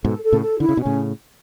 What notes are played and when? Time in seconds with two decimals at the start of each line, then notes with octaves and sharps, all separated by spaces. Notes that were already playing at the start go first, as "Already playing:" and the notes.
0.04 G#2 B2 A4
0.24 A4
0.32 A2 C#3
0.41 A4
0.60 D3 E4
0.69 C#3
0.77 B2 C#4
0.85 A2 C#3